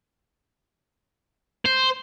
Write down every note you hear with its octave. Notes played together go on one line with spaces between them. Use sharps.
C5